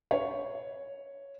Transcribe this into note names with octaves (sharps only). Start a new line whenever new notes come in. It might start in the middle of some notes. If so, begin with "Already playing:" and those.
C#5